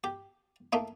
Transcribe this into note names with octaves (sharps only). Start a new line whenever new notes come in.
G4
A3 A#3 D#4